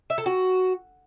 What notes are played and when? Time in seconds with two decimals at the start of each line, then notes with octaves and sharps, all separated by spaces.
0.10 E5
0.18 A4
0.26 F#4